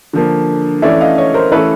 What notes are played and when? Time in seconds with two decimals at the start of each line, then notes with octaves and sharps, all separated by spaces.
0.13 D3 F3 A#3
0.82 E3 A3 C#4 D5 E5
1.01 D#5 F5
1.18 C#5 D#5
1.34 A#4 C5
1.52 E3 A3 C#4 A4 B4